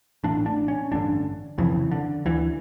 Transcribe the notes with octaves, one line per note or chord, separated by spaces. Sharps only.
A1 A2 D4
D4
C#4
A1 G2 D3 D4
F1 F2 C#3 E3
D3
D2 D3 E3